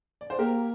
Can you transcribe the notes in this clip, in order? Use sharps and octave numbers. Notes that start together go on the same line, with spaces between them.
D5
C5
A#3 G4 A#4